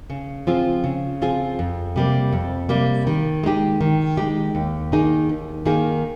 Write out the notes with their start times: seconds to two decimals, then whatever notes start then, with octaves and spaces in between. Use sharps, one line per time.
0.10 C#3
0.47 F3 C4 F4 G#4
0.84 C#3
1.22 F3 C4 F4 G#4
1.59 F2
1.96 C3 G3 A#3
2.33 F2
2.69 C3 G3 A#3
3.07 D#3
3.44 G#3 D#4 G4
3.81 D#3
4.17 G#3 D#4 G4
4.55 D#2
4.92 D#3 A#3 D#4 G#4
5.29 D#2
5.65 D#3 A#3 D#4 G#4